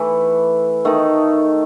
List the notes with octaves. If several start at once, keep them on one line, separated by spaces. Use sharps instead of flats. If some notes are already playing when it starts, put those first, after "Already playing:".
Already playing: E3 A3 E4
D#3 A3 D#4